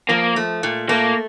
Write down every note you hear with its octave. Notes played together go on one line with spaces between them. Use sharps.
F3 A#3
A3
A#2
A3 A#3